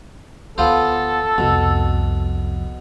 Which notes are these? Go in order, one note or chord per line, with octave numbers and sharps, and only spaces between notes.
D2 B3 F4 A4 C5
C2 F2 B2